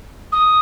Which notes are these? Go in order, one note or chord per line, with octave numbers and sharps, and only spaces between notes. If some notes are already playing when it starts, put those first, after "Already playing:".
D#6